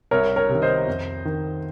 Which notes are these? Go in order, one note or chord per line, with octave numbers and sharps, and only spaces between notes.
C2 A#4 C#5
A#4 C#5
C3 D#3
C5 D#5
F2
D#3